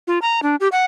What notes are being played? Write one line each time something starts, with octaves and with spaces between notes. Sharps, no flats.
F4
A#5
D4
G4
F#5